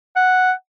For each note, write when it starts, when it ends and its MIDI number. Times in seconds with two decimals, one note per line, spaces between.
0.16 0.52 78